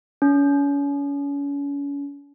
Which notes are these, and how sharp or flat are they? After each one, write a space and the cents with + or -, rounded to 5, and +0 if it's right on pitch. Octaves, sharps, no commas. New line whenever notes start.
C#4 +35